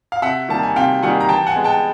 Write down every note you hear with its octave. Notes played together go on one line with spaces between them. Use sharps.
F5
C3 E5 F#5
D#3 G3 A#3 A5
G#5
C3 F5 G5
D#3 G3 A#3 F#5 G#5
A#5
E3 G5 A5
F#5 G#5
G#3 B3
G5 A5